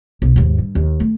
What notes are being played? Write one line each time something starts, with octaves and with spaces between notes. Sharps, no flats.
B1
D#2 G#2
G2
D#2
A3